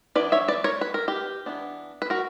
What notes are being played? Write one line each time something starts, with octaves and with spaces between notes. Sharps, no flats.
E3 B3 D4 B4 D5
C#5 E5
B4 D5
A#4 C#5
B4
A#4
G4 B4
E3 B3 D4
B4
F#4 A#4